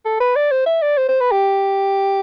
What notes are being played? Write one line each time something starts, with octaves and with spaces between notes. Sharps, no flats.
A4
B4
D5
C5
E5
D5
C5
C5
B4
G4